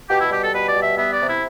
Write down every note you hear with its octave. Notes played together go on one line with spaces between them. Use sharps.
B2 G4
E4
G3 G4
A4
B2 B4
D5
G3
E5
B3 E5
D5
C3
E4